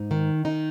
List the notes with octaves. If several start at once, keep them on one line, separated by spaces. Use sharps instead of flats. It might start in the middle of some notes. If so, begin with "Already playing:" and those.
Already playing: G#2 D#4
D#3
D#3 D#4